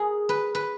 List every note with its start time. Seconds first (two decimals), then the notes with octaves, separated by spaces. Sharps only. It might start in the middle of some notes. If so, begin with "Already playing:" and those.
Already playing: G#4 A#4
0.29 B4
0.55 B4